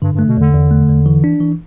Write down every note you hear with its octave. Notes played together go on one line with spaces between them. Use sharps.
G2 D3
G2
A3
B2
E2 D3
E2
A3
E2
E3
D4
E3